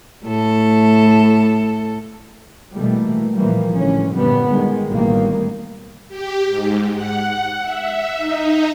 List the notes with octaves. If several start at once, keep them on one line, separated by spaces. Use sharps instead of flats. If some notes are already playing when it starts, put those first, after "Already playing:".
A2 A4
B2 E3 G3 A3 A#3
A#2 E3 F3 G3 A#3
A1 D3 E3 C#4
G1 F#2 A#2 G3 B3
D#3 G#3
A1 B2 D#3 G3 A#3
G4
G#2
F#5
E5
D#4